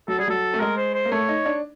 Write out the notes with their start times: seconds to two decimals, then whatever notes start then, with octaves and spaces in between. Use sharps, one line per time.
0.08 F#3 A4
0.18 G3 G#4
0.28 F#3 A4
0.54 A3
0.60 G#3 A#4
0.77 C5
0.94 C5
1.05 A#3
1.11 A3 C#5
1.29 D#4
1.46 D4